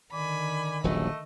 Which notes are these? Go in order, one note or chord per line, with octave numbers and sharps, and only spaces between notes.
D3 D#3 D5 G#5 B5
D#1 A#1 F#3 A3 D#5